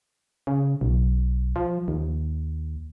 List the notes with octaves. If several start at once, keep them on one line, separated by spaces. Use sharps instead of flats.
C#3
B1
F3
D#2